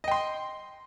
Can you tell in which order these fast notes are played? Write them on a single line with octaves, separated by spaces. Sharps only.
D#5 G5 C6